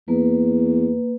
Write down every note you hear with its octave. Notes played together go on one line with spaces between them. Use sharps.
E2 A#3 B4